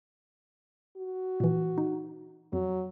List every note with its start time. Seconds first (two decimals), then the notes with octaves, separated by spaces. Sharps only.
0.97 F#4
1.40 A#2 E3
1.78 D#4
2.53 F2 F#3